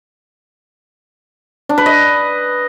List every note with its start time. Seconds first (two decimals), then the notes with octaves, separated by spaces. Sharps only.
1.69 D4
1.78 B4
1.86 D#5